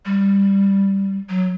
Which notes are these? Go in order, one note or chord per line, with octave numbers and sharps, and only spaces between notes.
G3
F#3